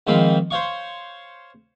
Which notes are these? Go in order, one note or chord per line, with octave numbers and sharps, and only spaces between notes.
G#2 D#3 F3 C4 F5 B5
C5 C#5 F5 C#6